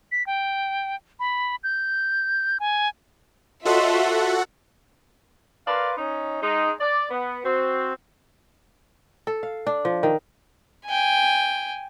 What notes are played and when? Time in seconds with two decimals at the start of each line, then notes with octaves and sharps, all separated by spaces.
0.12 B6
0.27 G5
1.20 B5
1.64 G6
2.60 G#5
3.65 F4 F#4 A4 C5 C#5 D#5 E5 F#5
5.67 A#4 B4 D5 F5 C6
5.98 C#4 D#4
6.42 G#3 D#4
6.80 D5
7.11 B3
7.45 C4 F#4
9.27 A4
9.43 F5
9.67 D4
9.85 F3
10.03 D#3
10.87 G5 G#5